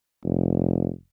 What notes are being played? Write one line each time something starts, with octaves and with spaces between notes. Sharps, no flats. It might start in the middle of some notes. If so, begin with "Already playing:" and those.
F1